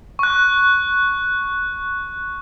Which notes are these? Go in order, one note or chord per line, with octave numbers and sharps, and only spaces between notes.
C#6 F#6